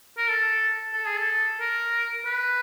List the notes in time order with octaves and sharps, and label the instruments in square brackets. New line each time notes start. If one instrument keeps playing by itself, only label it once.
[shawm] A#4
A4
A4
G#4
A4
A#4
B4